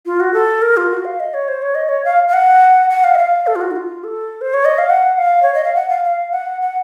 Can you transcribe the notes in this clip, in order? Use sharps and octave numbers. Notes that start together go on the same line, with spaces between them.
F4
F#4
A4
A#4
F4
F#4
F5
D#5
C#5
C5
C#5
D#5
C#5
F5
F5
F#5
F#5
F5
D#5
F5
A4
F4
F#4
D#4
F4
A4
C5
C#5
D#5
F5
F#5
F5
C#5
D#5
F5
F#5
F5
F5
F#5
F#5